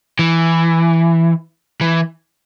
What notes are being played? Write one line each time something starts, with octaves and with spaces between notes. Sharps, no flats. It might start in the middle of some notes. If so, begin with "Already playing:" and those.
E3
E3